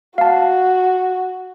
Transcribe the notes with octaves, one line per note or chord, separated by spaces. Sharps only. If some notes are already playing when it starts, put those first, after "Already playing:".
F#4 F5 A5